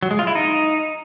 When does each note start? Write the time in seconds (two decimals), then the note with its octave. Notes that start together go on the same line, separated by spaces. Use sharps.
0.03 F#3
0.11 G#3
0.19 F4
0.27 E4
0.35 D#4